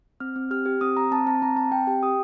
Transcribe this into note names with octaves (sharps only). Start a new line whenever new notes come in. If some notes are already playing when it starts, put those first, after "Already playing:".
C4 F6
C4
G4 F6
G4
C4 D#6
C4 A#5
C4 A5
C4 A5
C4 A#5
C4 A5
C4 G5
G4 G5
G4 D#6